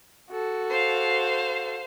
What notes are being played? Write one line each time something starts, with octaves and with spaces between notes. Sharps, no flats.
F#4 A4
C5 F5